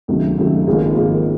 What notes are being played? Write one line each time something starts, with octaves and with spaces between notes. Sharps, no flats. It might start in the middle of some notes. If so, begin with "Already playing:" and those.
C#2 C3 D#3 F#3 A3
C#2 C3 D#3 F#3 A3
G#1 G#2 F3 A#3
G#1 G#2 F3 A#3